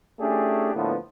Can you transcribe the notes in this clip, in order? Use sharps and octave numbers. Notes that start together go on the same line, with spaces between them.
A3 C#4 D4 E4 G4 G#4
A2 D3 F3 A#3 B3